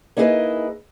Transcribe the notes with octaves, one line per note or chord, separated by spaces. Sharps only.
A#3 D#4 E4 G#4 B4 D#5